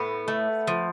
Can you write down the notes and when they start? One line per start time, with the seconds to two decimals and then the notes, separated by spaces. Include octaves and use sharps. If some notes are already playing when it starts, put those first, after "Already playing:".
Already playing: A2 B3
0.28 A3
0.67 F3